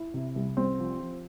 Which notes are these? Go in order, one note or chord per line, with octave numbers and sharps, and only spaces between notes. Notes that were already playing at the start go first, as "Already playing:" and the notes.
Already playing: E4
C3
C2
C2 C4
F3
F3